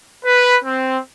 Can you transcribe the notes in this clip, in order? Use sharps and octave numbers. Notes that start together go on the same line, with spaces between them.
B4
C4